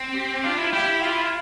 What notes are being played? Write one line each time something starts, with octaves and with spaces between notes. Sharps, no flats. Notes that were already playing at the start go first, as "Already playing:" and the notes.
Already playing: C4
G4
D4 F4
E4
E4 G4
F4